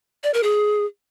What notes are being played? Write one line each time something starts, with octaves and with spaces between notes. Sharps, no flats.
D5
A#4
G#4